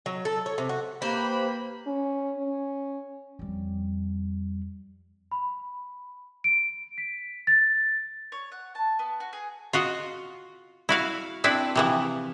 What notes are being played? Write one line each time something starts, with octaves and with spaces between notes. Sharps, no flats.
F#3
A4
C#5
C3
F#4
A#3 G4 B4 C5 B5
C#4
C#4
F2 G3
B5
D7
B6
A6
C#5
F#5
A5
B3
F#4
G#4
F4 F#4 D#5
E4 F#4 F5
C4 D4 E4 B4
C3 E3 F3